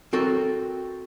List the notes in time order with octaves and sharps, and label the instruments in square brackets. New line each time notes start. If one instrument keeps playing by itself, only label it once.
[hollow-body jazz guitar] C4 F#4 A4 A#4